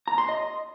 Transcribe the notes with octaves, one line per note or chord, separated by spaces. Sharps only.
A#5
C6
D#5